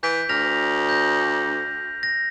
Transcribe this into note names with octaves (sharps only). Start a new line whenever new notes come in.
E3 G6 B6 D7
D2 F6 A#6 F7
G6 A#6
A#6